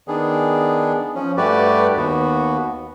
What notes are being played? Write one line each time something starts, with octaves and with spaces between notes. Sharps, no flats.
D#3 B3 D4 G#4
F3 C#4
G2 A3 F#4 G4 B4 D5
D#2 B3 F#4